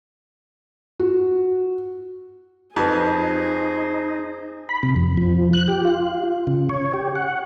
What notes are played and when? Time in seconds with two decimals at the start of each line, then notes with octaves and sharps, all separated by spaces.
0.99 F#4
2.76 F2 D#4 G4 G#4 B4 C5
4.69 B5
4.83 C3
4.96 F2
5.17 F3
5.53 F#6
5.68 G4
5.85 F4
6.47 C#3
6.69 C#5
6.94 G4
7.15 F#5